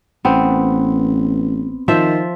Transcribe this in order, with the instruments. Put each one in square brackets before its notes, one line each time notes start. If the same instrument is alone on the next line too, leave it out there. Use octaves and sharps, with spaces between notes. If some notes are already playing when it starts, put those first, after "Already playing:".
[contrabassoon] A1 [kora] B3 C4
[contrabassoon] D#3 [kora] F3 C5 E5